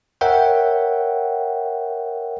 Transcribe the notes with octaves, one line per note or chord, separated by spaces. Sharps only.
A#4 C#5 E5 F#5 G5